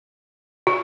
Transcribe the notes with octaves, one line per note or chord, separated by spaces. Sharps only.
F#4